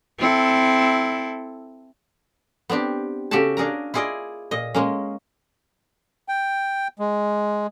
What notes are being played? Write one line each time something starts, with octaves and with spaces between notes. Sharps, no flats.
C4 E4 A4
B3 C4 D4 G4
C#3 F#4 G4 A4 F#5 A5
A#3 D4 G#4 A#4 A#5
E4 F4 G#4 D5 D#5
A#2 D#5
G#3 A#3 C#4
G5
G#3